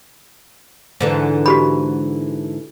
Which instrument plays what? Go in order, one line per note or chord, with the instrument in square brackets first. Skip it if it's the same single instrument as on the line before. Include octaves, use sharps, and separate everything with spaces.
[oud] G#2 D3 E3
[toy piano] F#4 G4 B5